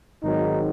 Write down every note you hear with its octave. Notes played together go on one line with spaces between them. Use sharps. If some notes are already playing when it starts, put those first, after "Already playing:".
G#1 G#2 D#3 F#3 D#4